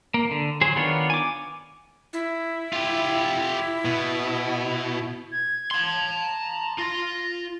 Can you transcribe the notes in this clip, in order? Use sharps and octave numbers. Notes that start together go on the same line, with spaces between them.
A#3
D3
F#3 G#4 C5
D#3 B3 D4 F4 C#5
G#5 D6
E4
F4 G4
B2
G#6
A5 C6
A#5
F4 C6 A#6